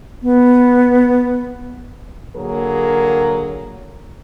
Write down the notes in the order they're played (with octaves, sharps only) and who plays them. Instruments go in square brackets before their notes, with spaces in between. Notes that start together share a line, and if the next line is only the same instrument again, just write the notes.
[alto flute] B3
[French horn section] D3 F#3 A#3 G#4 A#4